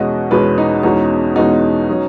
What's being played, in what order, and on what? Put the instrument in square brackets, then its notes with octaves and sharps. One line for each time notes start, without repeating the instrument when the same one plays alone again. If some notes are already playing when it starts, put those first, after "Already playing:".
Already playing: [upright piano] E2 B2 G#3 C#4 F#4 [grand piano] D#5
[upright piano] E2 B2 G#3 C#4 F#4 [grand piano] B4
[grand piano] D#4
[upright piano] E2 B2 G#3 C#4 F#4 [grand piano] D#4
[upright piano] E2 B2 G#3 C#4 F#4 [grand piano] D#4
[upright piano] F#3 C#4